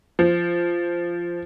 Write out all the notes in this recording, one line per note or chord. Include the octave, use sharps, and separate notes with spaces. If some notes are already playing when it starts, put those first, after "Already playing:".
F3